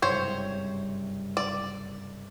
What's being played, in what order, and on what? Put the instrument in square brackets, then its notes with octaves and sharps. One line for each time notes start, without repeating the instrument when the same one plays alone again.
[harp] F#1 G2 C3 [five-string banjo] C5 C#5
[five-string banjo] D5